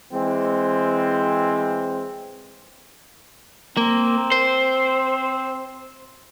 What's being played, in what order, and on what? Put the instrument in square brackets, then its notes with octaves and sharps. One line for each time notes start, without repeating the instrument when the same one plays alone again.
[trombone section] E3 G#3 C4
[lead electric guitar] A#3 [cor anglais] C4
[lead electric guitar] C5